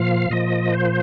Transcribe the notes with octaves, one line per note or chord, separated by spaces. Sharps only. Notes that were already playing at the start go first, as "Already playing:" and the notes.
Already playing: A#2 F3 F5
A#2 F3 D#5
C5